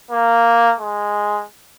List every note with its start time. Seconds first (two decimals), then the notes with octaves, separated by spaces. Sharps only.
0.11 A#3
0.80 G#3